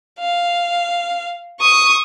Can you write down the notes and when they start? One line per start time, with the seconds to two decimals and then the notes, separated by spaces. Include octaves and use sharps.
0.19 F5
1.60 C#6 D#6